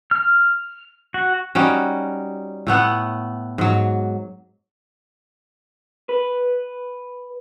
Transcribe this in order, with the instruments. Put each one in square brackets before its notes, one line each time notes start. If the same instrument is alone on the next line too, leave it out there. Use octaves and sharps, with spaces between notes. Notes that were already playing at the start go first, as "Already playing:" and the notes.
[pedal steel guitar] F6
F#4
[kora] G3 C#4 D#4 F#4
A2 A3 B3 F#5
G#2 F#3
[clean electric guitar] B4